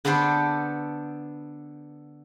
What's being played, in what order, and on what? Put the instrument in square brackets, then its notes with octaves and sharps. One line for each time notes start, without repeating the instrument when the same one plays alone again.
[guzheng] D3 B3 D4 A4 C5